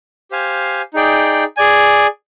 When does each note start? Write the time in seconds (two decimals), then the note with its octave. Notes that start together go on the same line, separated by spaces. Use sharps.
0.31 G4 C5 F5 G#5
0.94 D#4 G#4 D5 G5
1.57 G#4 D5 G#5